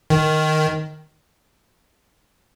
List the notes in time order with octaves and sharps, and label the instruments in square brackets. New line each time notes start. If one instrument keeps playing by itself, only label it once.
[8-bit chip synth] D#3